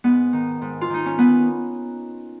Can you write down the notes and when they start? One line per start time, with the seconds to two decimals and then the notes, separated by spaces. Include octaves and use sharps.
0.04 G#2 B3
0.33 D#3
0.62 G#2
0.81 F4
0.90 D#3 D#4
1.06 C#4
1.19 B3